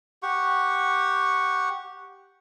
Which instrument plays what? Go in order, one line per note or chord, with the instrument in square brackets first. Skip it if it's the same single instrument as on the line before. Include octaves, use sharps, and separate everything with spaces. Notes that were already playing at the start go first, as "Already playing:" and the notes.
[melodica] G4 F#5 C#6